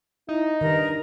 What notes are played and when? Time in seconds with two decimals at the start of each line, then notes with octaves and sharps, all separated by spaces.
0.29 D#4 E4
0.61 G2 D#3 A#4